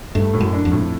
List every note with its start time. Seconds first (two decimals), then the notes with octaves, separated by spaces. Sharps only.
0.15 G2 A3
0.33 A2
0.41 F#2
0.53 D4
0.65 F2
0.72 A2